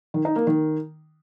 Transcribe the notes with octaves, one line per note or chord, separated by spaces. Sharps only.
D#3
D#4
A#3
D#3